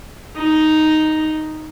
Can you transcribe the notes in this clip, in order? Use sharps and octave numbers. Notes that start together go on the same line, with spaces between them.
D#4